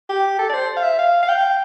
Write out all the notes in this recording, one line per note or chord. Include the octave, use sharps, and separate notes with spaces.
G4
A4
D5
C5
F5
E5
F5
F5
G5